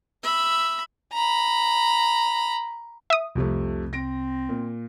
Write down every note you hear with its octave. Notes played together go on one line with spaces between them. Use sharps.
E5 B5
A#5 B5
E5 D#6
C2 F2 C3 A3
C4 A#6 D7
A#2